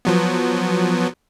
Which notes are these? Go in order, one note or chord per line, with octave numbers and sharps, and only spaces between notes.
F3 F#3 B3